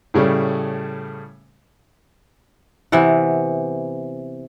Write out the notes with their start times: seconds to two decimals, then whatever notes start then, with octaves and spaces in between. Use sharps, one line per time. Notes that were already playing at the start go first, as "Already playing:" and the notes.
0.14 A2 C#3 G3 A3
2.92 C3 E3 B3 F#5